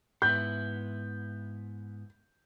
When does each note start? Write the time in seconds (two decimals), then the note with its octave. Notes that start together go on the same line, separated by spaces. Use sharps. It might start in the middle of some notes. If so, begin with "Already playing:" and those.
0.22 G#2 B3 E4 G6